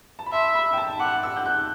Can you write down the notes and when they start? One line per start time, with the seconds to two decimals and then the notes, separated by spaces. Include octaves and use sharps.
0.19 A5
0.26 B5
0.32 E5 C6
0.55 B5
0.73 G5
0.78 A5
1.00 F#5 D6
1.23 E6
1.37 G6
1.46 F#6